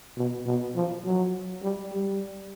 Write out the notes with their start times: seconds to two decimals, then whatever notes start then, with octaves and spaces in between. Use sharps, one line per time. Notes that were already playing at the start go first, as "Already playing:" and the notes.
0.17 B2
0.46 B2
0.75 F3
1.04 F#3
1.63 G3
1.92 G3